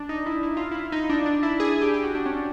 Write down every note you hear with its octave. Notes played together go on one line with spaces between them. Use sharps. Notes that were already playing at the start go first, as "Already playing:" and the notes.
Already playing: D4
D#4
E4
E4
F4
E4
D#4
D4
D4
E4
G#4
G#4
G4
G4
F#4
D4
C#4
D4